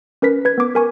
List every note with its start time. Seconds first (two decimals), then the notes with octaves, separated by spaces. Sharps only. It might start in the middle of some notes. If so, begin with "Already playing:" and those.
0.22 C#4 A#4 B4 B6
0.45 B4 G#6
0.58 B3 D6
0.75 A#4 G#5 C#6